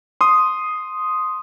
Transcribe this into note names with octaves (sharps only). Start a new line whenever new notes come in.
C6 D#6